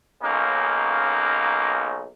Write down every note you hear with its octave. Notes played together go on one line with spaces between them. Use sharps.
B1 C#3 A#3 C#4 D#4